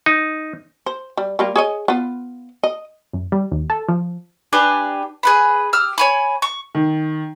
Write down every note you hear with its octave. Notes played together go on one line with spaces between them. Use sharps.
D#4
C5
G3
G3 A#3 F4
G#4 C#5 D#5
B3 F4
D#5
F#2
G3
D#2
A4
F3
D4 G4 B4 G#5
G#4 B4 B5
G4 E6 F6
C#5 G#5 B5
C#6
D#3